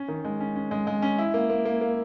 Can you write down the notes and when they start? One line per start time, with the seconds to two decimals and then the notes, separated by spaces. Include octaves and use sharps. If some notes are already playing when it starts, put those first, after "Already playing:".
Already playing: C#4
0.08 D#3
0.25 G#3
0.40 C#4
0.56 C#4
0.71 G#3
0.87 G#3
1.02 C#4
1.18 E4
1.34 A#3
1.50 A#3
1.65 A#3
1.81 A#3